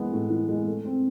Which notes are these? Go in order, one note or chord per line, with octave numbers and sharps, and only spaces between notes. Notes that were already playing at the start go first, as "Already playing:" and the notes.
Already playing: E3 G#3 B3
A2
E3
G#3
A3
C4